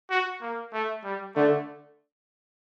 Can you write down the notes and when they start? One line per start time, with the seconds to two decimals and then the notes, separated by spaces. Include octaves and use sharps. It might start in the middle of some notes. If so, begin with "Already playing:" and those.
0.10 F#4
0.42 A#3
0.73 A3
1.04 G3
1.35 D3 A3